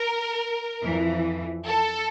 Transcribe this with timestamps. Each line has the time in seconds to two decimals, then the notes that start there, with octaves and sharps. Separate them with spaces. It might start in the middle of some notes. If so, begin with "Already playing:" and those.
Already playing: A#4
0.84 F2 E3
1.67 A4